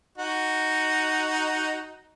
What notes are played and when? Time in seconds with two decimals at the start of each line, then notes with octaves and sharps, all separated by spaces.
0.18 D#4 F#4